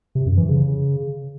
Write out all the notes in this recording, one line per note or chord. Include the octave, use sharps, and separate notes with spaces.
C3
F#2
E3
C#3